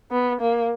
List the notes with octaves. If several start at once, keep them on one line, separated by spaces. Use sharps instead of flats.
B3
A#3